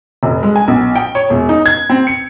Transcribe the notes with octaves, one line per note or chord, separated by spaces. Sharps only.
F1
G#3
G#5
B1
G5
C#5
E1
D#4
G#6
C4
C#7